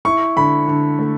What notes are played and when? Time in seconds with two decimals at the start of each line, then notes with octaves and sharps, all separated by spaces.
0.05 E4 C#6
0.36 D3 B5
0.68 D3
0.99 A3